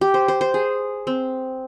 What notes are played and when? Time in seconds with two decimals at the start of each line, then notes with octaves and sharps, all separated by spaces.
0.01 G4
0.14 C5
0.28 C5
0.41 C5
0.54 G#4
1.07 C4